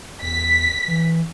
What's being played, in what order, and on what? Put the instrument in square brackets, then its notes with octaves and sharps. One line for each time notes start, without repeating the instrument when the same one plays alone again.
[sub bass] E2 [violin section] B6
[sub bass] E3